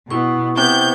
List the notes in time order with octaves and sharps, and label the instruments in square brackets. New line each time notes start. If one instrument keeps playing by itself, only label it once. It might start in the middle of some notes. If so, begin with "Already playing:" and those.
[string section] B2 [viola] B3 [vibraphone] E4 C#6
[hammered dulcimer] C3 [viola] B3 [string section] G6